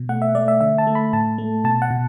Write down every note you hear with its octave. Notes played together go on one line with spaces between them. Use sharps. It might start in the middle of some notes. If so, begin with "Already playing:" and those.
Already playing: B2
A3 F#5
E5
A3 D5
E5
D3 E5
A5
A3
B5
A2 A5
A3
B2 A5
F#5
B2